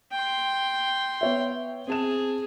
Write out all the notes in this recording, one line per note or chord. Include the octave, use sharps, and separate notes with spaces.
G5 C6
B3 C#5 E5
C4 G#4 A5 E7